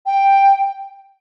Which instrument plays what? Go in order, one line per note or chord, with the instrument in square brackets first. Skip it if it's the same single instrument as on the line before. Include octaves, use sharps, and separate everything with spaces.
[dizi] G5